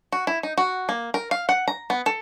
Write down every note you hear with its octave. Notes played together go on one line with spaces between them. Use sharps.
F#4
E4
D#4
F#4
A#3
A#4
F5
F#5
A#5
B3
A4